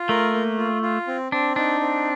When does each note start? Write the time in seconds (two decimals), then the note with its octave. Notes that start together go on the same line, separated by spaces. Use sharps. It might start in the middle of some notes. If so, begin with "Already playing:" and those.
Already playing: F4
0.09 A3 A#4
0.34 A#3
0.58 F4
0.82 F4
1.07 C4
1.32 C4 D4
1.56 D4 D#4
1.80 C4